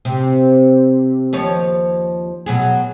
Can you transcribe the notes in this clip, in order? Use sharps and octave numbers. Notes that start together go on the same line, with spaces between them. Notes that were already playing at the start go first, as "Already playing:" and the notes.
C3
D#2 F3 C#5
B2 F#3 G#4